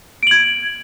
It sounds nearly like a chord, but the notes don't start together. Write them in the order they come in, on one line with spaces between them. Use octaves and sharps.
D7 F#7 G#6